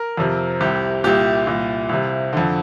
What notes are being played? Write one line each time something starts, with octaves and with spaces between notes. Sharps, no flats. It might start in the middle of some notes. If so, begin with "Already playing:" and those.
Already playing: A#4
F2 C3
C2 C3 G4
C2 A#2 G4
C2 A#2
C2 C3
F2 D3